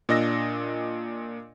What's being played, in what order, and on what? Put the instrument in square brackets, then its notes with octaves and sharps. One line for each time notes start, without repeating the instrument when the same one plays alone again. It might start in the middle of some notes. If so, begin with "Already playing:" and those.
[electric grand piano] A#2 D4 D#5 E6 A#6